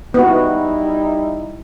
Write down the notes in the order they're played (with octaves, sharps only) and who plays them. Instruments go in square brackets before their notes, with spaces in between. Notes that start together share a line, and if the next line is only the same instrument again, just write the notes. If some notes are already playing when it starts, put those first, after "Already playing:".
[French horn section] G3 D#4 E4 [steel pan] B3 F#4